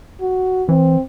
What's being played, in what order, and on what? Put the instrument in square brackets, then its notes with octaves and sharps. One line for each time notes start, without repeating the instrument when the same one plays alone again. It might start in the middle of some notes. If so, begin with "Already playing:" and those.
[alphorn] F#4
[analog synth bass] E3 [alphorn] C4